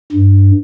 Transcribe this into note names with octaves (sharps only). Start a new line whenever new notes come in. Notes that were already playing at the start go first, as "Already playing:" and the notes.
G2